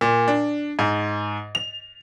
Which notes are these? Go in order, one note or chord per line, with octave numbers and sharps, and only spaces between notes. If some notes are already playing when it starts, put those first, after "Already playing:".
A#2
D4
G#2
F7